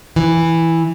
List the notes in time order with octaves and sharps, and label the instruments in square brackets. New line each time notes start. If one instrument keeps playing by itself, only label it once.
[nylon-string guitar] E3